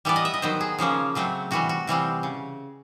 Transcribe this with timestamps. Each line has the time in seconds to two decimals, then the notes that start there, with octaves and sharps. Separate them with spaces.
0.05 E3 G3 B3 D5
0.16 D#5
0.25 E5
0.34 D#5
0.42 D#3 F#3 B3 C5
0.61 G#4
0.79 C#3 F3 A#3 C#4
1.15 C#3 F#3 A3 C4
1.51 C3 E3 G3 F#4
1.69 F#4
1.87 C3 E3 G3 C4
2.23 C#3